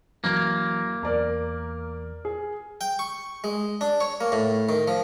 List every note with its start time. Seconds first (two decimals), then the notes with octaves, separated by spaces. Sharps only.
0.24 F#2 E3 A#3 G#6
1.03 E2 A#4 D5 A#5
2.25 G#4
2.81 G5
2.99 C#6
3.44 G#3
3.81 D4
4.00 C#5
4.21 A#3
4.32 A2
4.69 D#3
4.88 F3